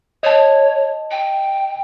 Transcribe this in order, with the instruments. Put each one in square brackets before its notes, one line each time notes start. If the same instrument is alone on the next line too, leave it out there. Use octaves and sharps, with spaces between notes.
[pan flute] C#5 [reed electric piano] D#5 A5
[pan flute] G5